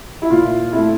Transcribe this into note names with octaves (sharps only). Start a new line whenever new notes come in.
E4
A#2 F4
A3 C4 E4